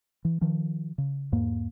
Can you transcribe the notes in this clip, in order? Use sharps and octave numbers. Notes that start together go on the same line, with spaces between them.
E3
D#3 F3
C#3
E2 G#2 A#3